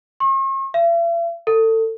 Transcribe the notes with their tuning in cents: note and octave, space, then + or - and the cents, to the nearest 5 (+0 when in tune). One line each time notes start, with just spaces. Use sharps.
C#6 -45
E5 +45
A4 +30